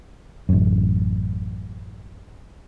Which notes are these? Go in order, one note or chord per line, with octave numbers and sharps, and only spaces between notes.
A1 F#2